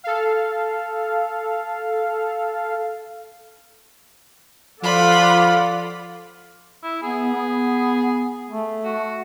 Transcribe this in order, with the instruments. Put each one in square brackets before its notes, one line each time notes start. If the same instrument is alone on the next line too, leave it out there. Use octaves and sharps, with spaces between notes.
[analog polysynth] A4 F5
[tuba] F3 [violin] F4 B5 [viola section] A4 D5 F#5 [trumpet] F5
[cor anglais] E4
[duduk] B3 [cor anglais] G#4
[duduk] B3
A3
[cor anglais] F#4